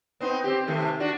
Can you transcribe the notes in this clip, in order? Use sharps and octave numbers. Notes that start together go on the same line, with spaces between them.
B3 C4 D#4
C4 G4
C3 D#3 A3
D4 F#4